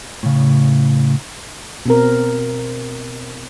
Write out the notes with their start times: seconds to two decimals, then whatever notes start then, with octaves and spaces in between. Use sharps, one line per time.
0.23 A2 C#3
1.86 B2 C4 A#4